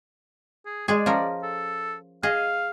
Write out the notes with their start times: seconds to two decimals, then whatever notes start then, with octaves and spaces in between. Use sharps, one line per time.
0.65 G#4
0.88 G#3 G#4 D5
1.06 F3 C#4 A#4
1.43 A4
2.23 G#4 D#5 F5